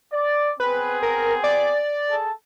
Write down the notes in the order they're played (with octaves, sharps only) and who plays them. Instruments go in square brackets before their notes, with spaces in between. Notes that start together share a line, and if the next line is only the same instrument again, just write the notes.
[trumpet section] D5
[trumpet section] B3 C4 G#4 [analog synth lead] B4
[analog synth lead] A#4
D5
[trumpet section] G#4 A4 A5